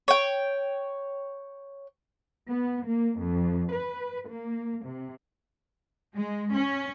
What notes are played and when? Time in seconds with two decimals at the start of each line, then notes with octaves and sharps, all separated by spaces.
0.08 C#5 G5
2.48 B3
2.86 A#3
3.19 F2
3.71 B4
4.28 A#3
4.85 C3
6.16 G#3
6.54 C#4